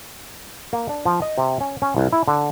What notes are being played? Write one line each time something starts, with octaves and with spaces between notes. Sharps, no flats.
A#3
D4
F3
D#5
C3
C#4
C#4
C2
E4
D3